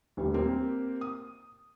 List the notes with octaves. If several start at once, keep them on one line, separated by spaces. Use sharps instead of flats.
D#1 D2 G3
A#3 C4 G4
D#6